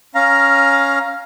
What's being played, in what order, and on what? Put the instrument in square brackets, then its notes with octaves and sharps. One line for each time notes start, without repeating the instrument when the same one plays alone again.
[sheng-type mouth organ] C#4 F5 A#5